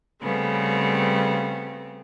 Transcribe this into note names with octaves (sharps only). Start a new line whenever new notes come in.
C#3 G3 A3 B3 C4